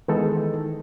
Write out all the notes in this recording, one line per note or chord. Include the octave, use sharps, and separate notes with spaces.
D#3 E3 G#3 B3 D#4 A4